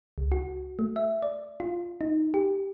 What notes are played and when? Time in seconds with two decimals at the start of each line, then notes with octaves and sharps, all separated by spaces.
0.18 C#2
0.32 F#4
0.79 A3
0.96 E5
1.22 D5
1.60 F4
2.01 D#4
2.34 G4